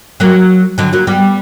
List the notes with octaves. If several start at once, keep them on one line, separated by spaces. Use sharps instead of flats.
F#3 A#3
D3 F#3
F#3 A#3
G3 B3